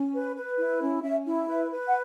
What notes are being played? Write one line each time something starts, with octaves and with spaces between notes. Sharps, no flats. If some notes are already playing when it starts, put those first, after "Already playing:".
Already playing: C#4
B4
B4
E4
C#4
C#4 E5
E4
B4 E5
B4
F#5